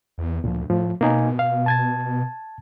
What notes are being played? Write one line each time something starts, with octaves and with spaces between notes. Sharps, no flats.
E2
D2 A#2 F3
A2 F3
B2 A#3 D#4 G#5
F5
A5 G#6 A6